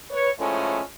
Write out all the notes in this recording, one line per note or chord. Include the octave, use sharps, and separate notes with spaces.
B4 C#5
A2 F3 G#3 A3 C#4